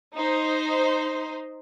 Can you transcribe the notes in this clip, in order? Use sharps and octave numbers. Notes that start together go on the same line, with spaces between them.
D#4 C5